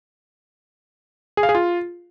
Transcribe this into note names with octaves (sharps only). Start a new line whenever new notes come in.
G#4
F5
G#4
F4